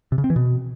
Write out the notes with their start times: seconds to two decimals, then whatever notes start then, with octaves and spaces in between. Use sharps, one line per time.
0.12 C3
0.18 C#3
0.24 C4
0.30 E3
0.36 B2